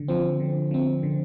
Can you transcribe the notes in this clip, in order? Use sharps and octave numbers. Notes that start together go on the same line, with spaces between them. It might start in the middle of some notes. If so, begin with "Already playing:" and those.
Already playing: D3
F3 C4
D3
F3 C4
D3